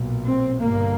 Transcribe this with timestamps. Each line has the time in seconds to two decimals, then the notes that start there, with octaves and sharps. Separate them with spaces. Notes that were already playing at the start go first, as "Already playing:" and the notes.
Already playing: B1 A#2
0.26 C4
0.61 G1 G2 A#3